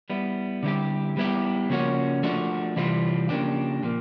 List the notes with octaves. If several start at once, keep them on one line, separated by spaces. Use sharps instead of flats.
G3 B3 E4
D3 G3 C4 E4 G4
G3 B3 E4 G4
C#3 F3 A#3 C#4 F#4
F3 A3 D4 F#4
C3 E3 G3 C4 F4
C#3 F3 A#3 D4 G4
A#2 F3 A#3